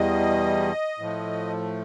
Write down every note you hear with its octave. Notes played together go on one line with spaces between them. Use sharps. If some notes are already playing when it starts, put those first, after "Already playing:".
Already playing: E2 B2 G3 D#5
A2 F3 A3